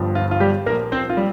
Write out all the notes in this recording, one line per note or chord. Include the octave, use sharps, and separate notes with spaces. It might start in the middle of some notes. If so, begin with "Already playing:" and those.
Already playing: G1 G2 F3
F4
F4
G3 G4
A#1 A#2 F3 A#3 A#4
C4 C5
F4
G3